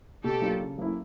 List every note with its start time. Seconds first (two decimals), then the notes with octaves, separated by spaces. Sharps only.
0.24 B2 G4 A4
0.41 F#3 A#3 D4 F4
0.60 C#3
0.78 F#3 A#3 C#4 E4